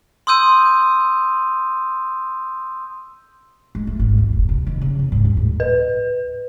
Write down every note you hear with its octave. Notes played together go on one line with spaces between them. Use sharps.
C6 D#6 E6 G6 D#7
G#3
A3
G#1
D#2
F#1
C2
D#3
C#3
E2
G#2
D#2
A2
B4